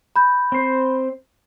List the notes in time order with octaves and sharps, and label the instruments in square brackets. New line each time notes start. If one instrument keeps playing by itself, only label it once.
[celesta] B5 G6
[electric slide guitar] C4 C5